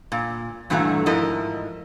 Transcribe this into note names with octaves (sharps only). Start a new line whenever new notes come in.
A#2
G2 A#2 E3 A3 F#4 A#5
G#2 F3 E4 A#4 D#5